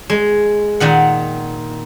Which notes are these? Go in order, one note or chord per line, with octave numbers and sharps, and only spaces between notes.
G#3
A#2 D#3 F#5